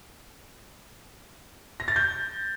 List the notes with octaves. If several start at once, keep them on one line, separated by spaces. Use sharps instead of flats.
A#6
A6
G6